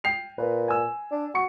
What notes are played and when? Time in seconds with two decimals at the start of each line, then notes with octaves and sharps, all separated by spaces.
0.04 G5 C7 F7
0.38 A#2 B4
0.68 G#5 E6
1.11 D4
1.35 F#4 C#6 C#7